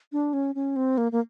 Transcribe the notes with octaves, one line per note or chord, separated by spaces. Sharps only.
D4
C#4
C#4
C4
A#3
A#3